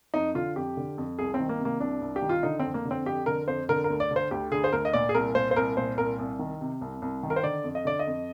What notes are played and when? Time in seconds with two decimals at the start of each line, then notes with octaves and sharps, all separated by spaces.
0.14 F2 D#4
0.35 D3 F4
0.56 F2 G4
0.77 D3
0.98 F2
1.18 C2 G#4
1.34 C4
1.39 D#3
1.49 A#3
1.60 C3
1.65 A#3
1.80 C2 D4
2.01 C2
2.16 G4
2.22 D#3
2.29 F4
2.43 D3 D#4
2.59 C4
2.65 F2
2.74 A#3
2.85 D3
2.91 C4
3.06 F2 G4
3.26 D3 A#4
3.47 F2 C5
3.69 D3 A#4
3.84 A#4
3.90 D2
4.00 D5
4.11 D3
4.16 C5
4.31 D2 G4
4.51 D3 G#4
4.64 C5
4.73 D2 A#4
4.85 D#5
4.93 A#2 D5
5.09 G#4
5.15 C2 A#4
5.35 A#2 C5
5.51 C5
5.56 C2 A#4
5.77 A#2 C5
5.98 C2 A#4
6.19 C2
6.39 D#3
6.61 C3
6.81 C2
7.02 C2
7.23 D#3
7.30 A#4
7.36 C5
7.43 D3 D5
7.64 F2
7.75 D#5
7.85 D3 D5
7.99 D#5
8.07 F2